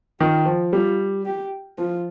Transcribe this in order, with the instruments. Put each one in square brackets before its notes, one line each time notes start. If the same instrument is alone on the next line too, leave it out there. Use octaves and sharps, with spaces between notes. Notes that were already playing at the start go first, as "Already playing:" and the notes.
[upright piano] D#3 [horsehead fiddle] F4
[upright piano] F3
[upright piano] G3 [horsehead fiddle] F4
[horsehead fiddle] G4
[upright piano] F3 [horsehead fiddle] F4